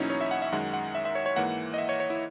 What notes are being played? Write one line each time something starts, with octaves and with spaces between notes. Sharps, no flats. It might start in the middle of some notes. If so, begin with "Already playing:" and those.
Already playing: E2 B2 F#3 A#3 C#4 D#4 E4
C#5
E5
F#5
E5
F#2 D#3 G#3 F#5
F#5
E5
E5
C#5
C#5
G#2 E3 A#3 F#5
D#5
E5
C#5
C#5
E4